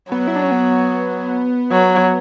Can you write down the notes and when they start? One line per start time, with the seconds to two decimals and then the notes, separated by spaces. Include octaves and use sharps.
0.12 F#3 B3
0.27 E4
0.36 D4
0.43 C#4
0.51 B3
1.72 F#3